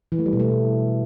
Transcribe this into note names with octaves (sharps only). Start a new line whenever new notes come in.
E3
A3
G3
B2
A3